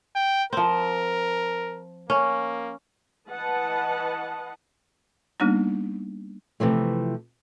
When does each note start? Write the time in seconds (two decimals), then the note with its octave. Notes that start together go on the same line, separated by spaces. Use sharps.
0.16 G5
0.53 F3 C4 A#4
2.10 A#3 C#4
3.29 E3 B4 D#5 F#5 A5
5.40 G3 A#3 B3 D4 D#4
6.60 C3 E3 F3 A3